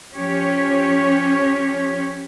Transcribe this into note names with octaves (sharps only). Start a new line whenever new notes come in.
F3 C#4 G4 C#5